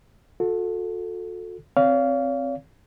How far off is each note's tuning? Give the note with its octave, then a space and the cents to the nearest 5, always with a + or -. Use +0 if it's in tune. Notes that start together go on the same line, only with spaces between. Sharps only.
F#4 -40 A4 +0
C4 +10 C#5 +45 F5 -5